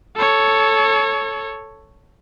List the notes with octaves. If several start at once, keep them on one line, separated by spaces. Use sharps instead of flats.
A4 C#5